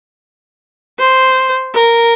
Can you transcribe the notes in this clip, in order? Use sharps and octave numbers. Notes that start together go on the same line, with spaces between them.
C5
A#4